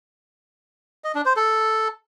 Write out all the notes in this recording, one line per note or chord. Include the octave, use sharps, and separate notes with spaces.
D#5
D4
C5
A4